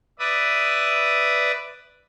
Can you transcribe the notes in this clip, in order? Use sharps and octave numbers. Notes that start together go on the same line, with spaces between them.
B4 D5 E5 D#6